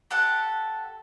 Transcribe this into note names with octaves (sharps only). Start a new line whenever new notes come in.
G4 A4 F#5